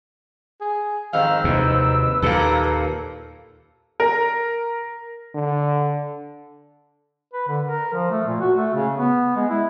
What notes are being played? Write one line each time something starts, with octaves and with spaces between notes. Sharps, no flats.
G#4
F2 G#2 D#3 F5 E6
D#2 C3 B4
D#2 A#2 A#3 A4
A#4
D3
B4
D3
A#4
F3
A3
A#2
F#4
A3
C#3
B3
G#3
E4